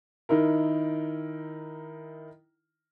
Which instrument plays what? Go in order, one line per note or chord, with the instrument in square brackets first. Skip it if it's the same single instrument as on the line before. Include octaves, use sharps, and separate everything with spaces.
[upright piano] D#3 D#4 E4 A#4